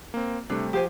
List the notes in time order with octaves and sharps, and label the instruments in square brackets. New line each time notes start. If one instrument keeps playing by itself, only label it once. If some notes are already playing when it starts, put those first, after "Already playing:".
[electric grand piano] A#3 C4
[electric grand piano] C3 G3 A3 [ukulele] D4
[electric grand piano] F3 [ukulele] G4 C5 G#5